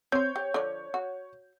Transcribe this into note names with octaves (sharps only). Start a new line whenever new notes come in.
C4 C5 C#5 G6
G4
D3 F3 D5
F#4